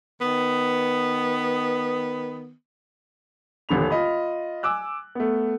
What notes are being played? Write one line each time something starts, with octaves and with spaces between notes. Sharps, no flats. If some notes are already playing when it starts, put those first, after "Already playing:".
D#3 B3
D#1 A1 D3 B5 F7
F4 D#5 B5
G#5 D6 E6 F#6
A3 B3